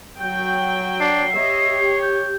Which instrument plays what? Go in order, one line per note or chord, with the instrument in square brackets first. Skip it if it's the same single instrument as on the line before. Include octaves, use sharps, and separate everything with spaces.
[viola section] F#3 F#4 G5 [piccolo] G6
[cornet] D4 [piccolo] C7
[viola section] G4 D#5 E5 [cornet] C#5
[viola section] G4
[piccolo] G6